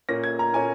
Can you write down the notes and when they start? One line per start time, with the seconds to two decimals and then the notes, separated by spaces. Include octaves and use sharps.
0.09 A#2 A#3 C#4 A#6
0.24 G#6
0.39 A#5
0.53 A#2 A#3 C#4 G#5